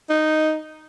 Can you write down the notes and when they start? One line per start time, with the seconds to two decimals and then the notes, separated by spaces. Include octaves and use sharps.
0.10 D#4